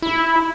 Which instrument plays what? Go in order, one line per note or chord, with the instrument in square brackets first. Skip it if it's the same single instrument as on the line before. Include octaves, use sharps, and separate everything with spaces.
[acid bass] E4